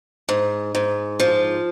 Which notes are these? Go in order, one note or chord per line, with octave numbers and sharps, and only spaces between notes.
G#2
G#2
F3